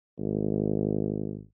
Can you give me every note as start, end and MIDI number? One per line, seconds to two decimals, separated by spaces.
0.18 1.40 32